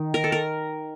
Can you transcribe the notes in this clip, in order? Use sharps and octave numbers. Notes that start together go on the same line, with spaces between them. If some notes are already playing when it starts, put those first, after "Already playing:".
Already playing: D#3
A#4
A4
A#4